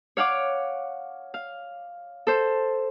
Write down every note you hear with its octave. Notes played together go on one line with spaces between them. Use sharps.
C#5 F5 F#5 D6
F5
A4 C5